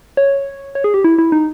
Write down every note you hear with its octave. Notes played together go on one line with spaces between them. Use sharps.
C#5
C#5
G#4
G4
E4
E4
D#4